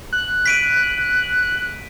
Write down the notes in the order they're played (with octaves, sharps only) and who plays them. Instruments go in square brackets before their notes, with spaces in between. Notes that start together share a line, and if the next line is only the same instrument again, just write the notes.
[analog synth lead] F#6
[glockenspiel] B6 D7 D#7